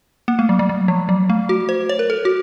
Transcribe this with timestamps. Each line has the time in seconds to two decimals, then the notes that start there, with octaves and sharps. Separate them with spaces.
0.28 A#3
0.39 A3
0.49 F#3
0.59 F#3
0.69 F#3
0.88 F3
1.09 F#3
1.30 A3
1.49 F#4
1.69 C5
1.89 C#5
1.99 A#4
2.10 A4
2.25 F#4